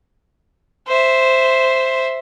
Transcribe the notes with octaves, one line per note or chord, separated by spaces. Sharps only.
C5 E5